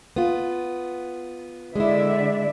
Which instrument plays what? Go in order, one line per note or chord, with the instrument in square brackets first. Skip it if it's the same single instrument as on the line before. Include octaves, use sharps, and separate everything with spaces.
[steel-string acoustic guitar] B3 F4
[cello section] D3 D5 E5 [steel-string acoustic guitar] G#3 E4